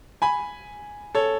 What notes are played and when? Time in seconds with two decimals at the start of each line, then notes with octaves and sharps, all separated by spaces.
0.22 G#5 B5
1.15 A4 C#5